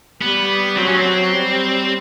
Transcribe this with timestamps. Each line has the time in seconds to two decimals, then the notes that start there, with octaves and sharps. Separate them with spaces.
0.22 G3 B3
0.77 F#3 C4
0.88 C#4
0.97 C4
1.32 G3